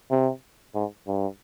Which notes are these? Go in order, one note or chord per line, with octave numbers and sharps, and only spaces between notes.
C3
G#2
G2